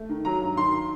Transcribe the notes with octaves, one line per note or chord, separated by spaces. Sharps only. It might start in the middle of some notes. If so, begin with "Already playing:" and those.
Already playing: A3
D#3
F#3 A#5
G2
D#3 C6